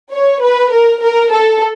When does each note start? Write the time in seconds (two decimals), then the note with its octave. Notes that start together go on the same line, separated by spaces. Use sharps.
0.13 C#5
0.42 B4
0.73 A#4
1.02 A#4
1.31 A4